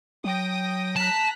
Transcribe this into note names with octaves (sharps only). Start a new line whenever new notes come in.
F#3 G5 D#6 A#6
A5 A#5 F#6 B6